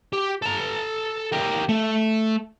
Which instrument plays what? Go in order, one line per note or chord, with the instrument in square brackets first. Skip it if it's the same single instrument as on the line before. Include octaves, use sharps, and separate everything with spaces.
[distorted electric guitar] G4
A4 A#5
G4 A#4
A3